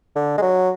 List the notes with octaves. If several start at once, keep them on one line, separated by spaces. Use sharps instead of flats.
D3
G#3
F#3